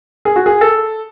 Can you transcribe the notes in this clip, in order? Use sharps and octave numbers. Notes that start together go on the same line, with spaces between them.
G#4
F#4
G#4
A4